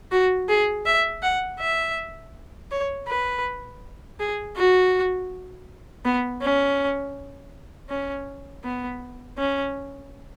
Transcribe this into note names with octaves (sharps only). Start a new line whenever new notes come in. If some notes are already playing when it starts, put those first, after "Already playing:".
F#4
G#4
E5
F#5
E5
C#5
B4
G#4
F#4
B3
C#4
C#4
B3
C#4